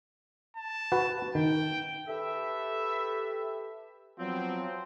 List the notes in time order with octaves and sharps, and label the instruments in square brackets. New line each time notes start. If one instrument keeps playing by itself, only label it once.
[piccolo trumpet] A5
[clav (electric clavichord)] F#4 B4
[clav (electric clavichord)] D#3 [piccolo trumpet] G5
[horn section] G4 A4 B4 E5
F3 F#3 B3 C4